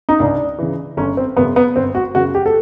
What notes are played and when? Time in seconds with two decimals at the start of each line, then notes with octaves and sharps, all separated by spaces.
0.09 D#4
0.20 C#2 D4
0.58 C#3 E3
0.97 G1 C#4
1.17 C4
1.36 F#2 C#3 B3
1.56 B3
1.76 G1 C4
1.95 F#4
2.15 F#2 C#3 F#4
2.35 G4
2.46 A4